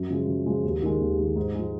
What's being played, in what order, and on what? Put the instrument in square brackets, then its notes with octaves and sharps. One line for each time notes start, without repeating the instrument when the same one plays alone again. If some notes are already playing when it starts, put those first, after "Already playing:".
Already playing: [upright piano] F#2
C#3 F3 G#3
F#2
C#3 F3 G#3
D#2
D#3 G#3
D#2
D#3 G#3
G#2
F3 G#3